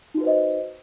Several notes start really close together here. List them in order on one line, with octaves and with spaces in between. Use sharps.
D#4 F#4 B4 C5 D#5